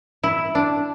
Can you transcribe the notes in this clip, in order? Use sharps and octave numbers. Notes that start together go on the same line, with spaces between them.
E4
D4